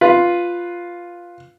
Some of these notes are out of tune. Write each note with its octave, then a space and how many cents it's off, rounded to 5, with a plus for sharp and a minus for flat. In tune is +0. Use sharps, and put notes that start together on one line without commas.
F4 +0 B4 +0